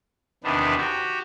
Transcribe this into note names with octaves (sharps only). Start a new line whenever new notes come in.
E2 C3 D#3 B3 D4
F#4 G4